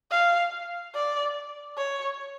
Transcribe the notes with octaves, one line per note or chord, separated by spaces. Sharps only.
F5
D5
C#5